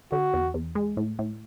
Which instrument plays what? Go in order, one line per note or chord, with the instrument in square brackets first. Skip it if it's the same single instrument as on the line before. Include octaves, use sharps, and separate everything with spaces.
[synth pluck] D3 [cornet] F#4
[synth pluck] E2
E2
G#3
A2
A2